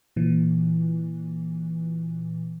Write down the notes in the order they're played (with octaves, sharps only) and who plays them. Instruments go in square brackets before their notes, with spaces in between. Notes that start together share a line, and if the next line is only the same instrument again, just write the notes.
[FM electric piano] A#2 E3